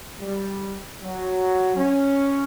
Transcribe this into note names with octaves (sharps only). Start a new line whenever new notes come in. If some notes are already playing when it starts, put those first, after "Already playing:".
G3
F#3
C#4